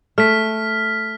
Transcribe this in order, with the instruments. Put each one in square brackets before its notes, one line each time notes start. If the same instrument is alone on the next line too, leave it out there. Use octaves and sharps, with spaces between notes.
[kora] A3 [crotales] F6 B6